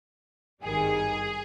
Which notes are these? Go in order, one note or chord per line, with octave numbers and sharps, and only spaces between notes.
G#1 G2 D#3 G3 G#4